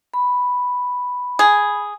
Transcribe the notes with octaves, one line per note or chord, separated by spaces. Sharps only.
B5
G#4